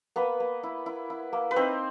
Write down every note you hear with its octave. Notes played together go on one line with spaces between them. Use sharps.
A#3 B3 B4
A#3
E4
E4
E4
A#3
B4
C4 D#4 C5